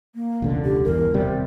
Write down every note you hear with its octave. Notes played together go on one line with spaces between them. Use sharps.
A#3
E1 C#2 D3
G4
G1 E2 A#4
D#1 C3 G3